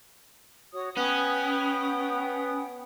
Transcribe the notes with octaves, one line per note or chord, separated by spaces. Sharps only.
F#4 C#5 D#6
B3 C#4 B4 G5 D#6